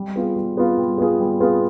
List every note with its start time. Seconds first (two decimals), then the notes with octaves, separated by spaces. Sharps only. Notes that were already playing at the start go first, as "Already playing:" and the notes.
Already playing: G3
0.16 B3 F4 G#4
0.36 G3
0.57 B3 F4 G#4
0.78 G3
0.98 B3 F4 G#4
1.19 G3
1.40 B3 F4 G#4